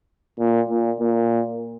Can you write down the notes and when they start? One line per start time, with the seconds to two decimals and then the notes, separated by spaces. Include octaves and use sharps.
0.39 A#2
0.69 A#2
1.00 A#2